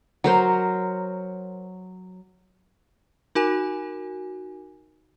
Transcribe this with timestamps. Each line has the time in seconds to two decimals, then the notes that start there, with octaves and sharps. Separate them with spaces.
0.24 F#3 A#4 C5
3.35 D#4 F#4 A#4 G#5